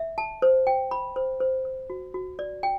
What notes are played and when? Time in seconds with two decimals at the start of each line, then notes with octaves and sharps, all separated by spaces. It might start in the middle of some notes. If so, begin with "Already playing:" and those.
Already playing: E5
0.18 A5
0.42 C5
0.67 G5
0.91 B5
1.16 C5
1.40 C5
1.65 C5
1.90 F#4
2.14 F#4
2.39 D5
2.63 G5